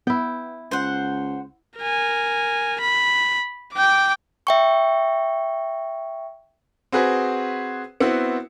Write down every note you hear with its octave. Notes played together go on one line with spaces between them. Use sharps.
B3 E4 G5
C#2 C5 F#5
A#4 G#5
B5
G5 D6
E5 G5 C#6
C4 F#4 G#4 B4
B3 C4 E4 F#4 F#5